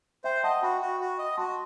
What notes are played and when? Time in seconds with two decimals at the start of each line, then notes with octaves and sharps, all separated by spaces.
0.24 C5 E5 G5
0.43 D#5 F#5 A5
0.62 F#4 G5 B5
0.81 F#4
1.00 F#4
1.19 D#5
1.37 F#4 A5 C6